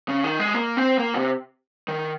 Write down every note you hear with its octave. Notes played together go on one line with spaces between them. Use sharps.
C#3
D#3
G#3
A#3
C4
A#3
C3
D#3